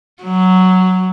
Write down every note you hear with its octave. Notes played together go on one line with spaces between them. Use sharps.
F#3